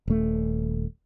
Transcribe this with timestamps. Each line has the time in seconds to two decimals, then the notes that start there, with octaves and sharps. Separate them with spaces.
0.08 D#1 A3